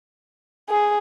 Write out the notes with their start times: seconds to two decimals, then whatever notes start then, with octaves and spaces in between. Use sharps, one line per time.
0.69 G#4